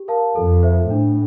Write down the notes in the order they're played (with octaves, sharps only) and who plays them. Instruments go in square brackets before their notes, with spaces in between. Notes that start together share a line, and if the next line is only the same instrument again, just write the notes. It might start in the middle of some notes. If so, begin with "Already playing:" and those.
Already playing: [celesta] G4
A#4 F5 A5
[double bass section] F2 [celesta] A4
[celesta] C5 E5
[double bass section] A2 [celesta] D4